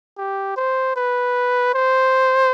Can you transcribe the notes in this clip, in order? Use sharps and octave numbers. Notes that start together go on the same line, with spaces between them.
G4
C5
B4
C5